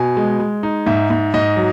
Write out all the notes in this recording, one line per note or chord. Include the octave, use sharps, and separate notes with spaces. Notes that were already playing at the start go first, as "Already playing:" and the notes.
Already playing: B2 G#5
G#3
G#3
D#4
G#2 E5
G#2
G#2 D#5
F#3